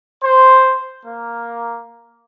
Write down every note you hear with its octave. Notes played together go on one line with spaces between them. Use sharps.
C5
A#3